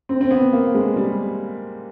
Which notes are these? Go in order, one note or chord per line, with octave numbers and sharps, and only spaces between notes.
C4
C4
B3
A#3
G#3
G3